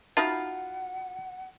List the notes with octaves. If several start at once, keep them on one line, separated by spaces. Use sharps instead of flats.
D#4 F4 F#4 E5 F#5 A5 B5 F6